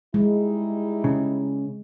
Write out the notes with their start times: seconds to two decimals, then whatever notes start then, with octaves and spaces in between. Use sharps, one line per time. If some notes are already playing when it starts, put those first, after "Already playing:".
0.14 G3 G#3 D#4 E4
1.04 C#3